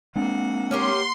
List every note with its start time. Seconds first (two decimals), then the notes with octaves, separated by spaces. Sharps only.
0.16 G#3 A#3 C4 D4 F#5
0.71 C#4 G4 A#4 C6